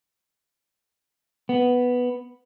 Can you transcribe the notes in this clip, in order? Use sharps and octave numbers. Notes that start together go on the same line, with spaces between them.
B3